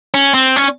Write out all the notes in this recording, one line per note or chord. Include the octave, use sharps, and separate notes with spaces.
C#4
C4
C#4